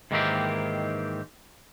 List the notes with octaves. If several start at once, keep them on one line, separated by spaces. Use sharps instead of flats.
G#2 D#3 E3 A#3 C4 G4